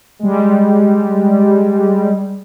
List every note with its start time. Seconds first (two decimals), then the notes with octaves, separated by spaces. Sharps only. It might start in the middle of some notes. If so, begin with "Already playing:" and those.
0.19 G3 G#3